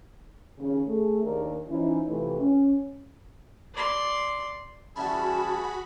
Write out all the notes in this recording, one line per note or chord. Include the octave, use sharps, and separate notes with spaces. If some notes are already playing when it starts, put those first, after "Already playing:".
D#2 C#3
A3 G#4
D#2 D4 A#4
E3 F3 C#4 D#4 E4
C3 E3 F3 A3 G4 B4
C#4
D5 C6
E3 G3 C#4 F#4 G#4 A5 B5